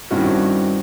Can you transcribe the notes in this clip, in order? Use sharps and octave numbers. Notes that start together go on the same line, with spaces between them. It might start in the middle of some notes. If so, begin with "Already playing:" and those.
G2 D#3 C4 C#4 E4 F#4